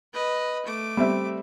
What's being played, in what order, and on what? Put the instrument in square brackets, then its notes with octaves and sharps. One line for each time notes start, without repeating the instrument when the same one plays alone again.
[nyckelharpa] B4 D#5
A3 D6
[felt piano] G3 C4 E5